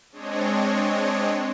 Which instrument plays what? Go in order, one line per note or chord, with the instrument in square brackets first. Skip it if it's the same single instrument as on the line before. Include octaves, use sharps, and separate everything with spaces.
[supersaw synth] G#3 C4 D4 C#5 D#5